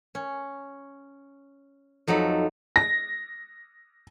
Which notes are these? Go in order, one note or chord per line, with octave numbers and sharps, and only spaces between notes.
C#4
F2 F#3 D#4 A4 B5
A#6